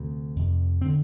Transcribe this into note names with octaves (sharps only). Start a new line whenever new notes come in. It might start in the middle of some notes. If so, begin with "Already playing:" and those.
Already playing: D2 C3
F2 C3
C4
D3